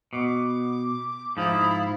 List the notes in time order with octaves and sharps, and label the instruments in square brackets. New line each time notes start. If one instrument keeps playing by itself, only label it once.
[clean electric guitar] B2 [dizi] D6
[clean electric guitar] G#2 F3 [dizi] E4 [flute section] F5 B5 D#6